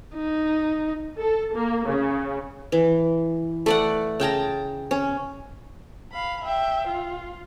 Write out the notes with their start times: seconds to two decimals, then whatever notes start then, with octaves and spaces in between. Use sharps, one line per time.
0.15 D#4
1.19 A4
1.54 A#3
1.86 C#3
2.72 E3
3.66 A3 D5 F#5
4.20 C#3 G5 A5 A#5
4.91 C#4
6.12 F5 B5
6.44 E5 G5
6.87 F4